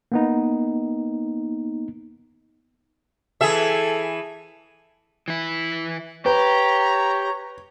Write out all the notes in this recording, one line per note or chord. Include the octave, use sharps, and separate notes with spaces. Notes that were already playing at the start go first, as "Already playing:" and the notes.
A#3 B3 D#4
E3 G#4 A4 E5
E3 E4
G4 B4 C#5 A#5